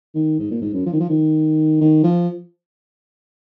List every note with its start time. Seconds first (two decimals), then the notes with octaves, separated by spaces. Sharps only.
0.15 D#3
0.39 G#2
0.51 A#2
0.62 G#2
0.73 F#2
0.86 F3
0.93 D#3
1.00 F3
1.09 D#3
1.81 D#3
2.03 F3